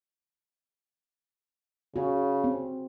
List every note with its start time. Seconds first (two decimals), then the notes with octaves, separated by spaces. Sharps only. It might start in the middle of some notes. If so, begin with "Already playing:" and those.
1.96 C#3 F#4
2.44 C4